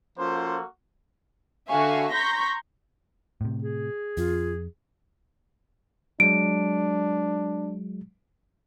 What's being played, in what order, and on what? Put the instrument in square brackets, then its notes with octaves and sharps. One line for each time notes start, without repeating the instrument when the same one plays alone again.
[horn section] F3 C#4 C5 [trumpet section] A#3 F#4 A4
[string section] D3 F#4 E5 F5 G#5 C#6
A#5 C6 C#6 G6 A#6 B6
[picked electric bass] A2 C3
[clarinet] G#4
[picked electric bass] F2 [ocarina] F4
[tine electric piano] F#3 G#3 [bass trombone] D4 [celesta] D7